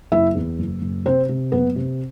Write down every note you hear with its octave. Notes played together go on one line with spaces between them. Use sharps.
F#1 E4 E5
E2
F#1
F#1
C3 C4 C5
C3
F#1 B3 B4
C3